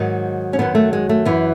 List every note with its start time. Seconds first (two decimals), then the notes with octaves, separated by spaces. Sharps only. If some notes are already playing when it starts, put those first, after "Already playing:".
Already playing: G#2 D#3 F#3 D#4
0.53 C#4
0.59 F#2 D#3 F#3 B3
0.75 A3
0.93 G#3
1.09 A3
1.25 F#2 E3 B3